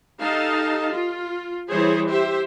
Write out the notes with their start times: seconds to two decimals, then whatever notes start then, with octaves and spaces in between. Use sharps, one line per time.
0.21 D#4 G4 A4 D#5 F5 A5
0.94 F4
1.69 E3 G3 G#4 C5 C#5
2.09 G4 C5 E5